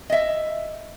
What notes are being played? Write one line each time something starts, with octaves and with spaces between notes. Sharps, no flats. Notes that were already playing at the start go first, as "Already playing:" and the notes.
D#5 E5